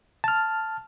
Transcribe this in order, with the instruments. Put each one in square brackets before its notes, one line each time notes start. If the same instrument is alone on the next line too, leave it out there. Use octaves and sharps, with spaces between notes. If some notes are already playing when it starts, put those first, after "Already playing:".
[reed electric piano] A5 F6